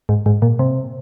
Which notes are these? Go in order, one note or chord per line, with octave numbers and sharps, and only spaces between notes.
G#2
G#2
A#2
C3